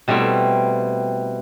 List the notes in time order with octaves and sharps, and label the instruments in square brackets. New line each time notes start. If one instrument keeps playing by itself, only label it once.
[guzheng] B2 G3 A3 C4 E4